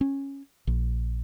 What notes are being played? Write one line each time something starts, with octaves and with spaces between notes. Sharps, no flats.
C#4
A#1